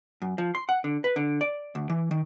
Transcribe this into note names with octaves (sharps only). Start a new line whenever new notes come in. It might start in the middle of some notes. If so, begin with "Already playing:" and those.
F#2
F3
C6
F#5
D3
B4
D3
D5
D2
E3
D#3